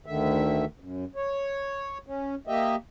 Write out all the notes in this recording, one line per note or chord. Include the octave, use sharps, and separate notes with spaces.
D2 D3 D#3 E5
F#2
C#5
C#4
A#3 G4 D#5 E5